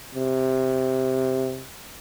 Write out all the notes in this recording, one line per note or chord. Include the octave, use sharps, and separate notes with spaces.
C3